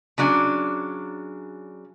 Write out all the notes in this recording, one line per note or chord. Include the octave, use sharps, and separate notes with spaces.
C#3 F#3 D4